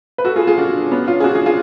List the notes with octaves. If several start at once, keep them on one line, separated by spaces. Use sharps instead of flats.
B4
F#4 A4
F4 G#4
F4 G#4
D4 F#4
C#4
B3 D4
C#4 F4
G#4
D4 F#4
F4 G#4
F4 G#4